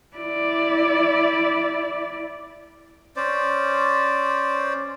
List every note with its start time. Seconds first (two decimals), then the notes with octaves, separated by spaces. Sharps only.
0.17 E4 D5
3.16 C#4 C5 D5